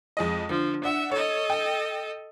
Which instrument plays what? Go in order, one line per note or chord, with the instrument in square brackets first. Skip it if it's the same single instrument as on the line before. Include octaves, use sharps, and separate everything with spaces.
[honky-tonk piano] F2 G#3 D#5
[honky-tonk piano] D3 [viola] F3
[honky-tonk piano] D4 F#5 [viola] E5
[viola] A4 D#5 [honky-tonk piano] C#5
[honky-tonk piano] G5